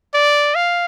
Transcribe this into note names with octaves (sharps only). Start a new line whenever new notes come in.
D5
F5